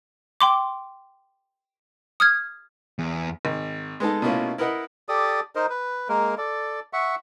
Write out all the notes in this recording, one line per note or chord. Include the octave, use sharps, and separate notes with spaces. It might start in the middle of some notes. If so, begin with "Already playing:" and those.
G5 C6 D6
D#6 F6 G#6
E2
G#1
G#3 B3 D#4 A4
B2 A3 A#3 C#4 E4 F4
E4 A#4 B4 D#5 F#5
G4 A4 D5 D#6
D#4 A#4 C5 D#5
B4
G#3 A#3 A#4
A4 D5
E5 F#5 C#6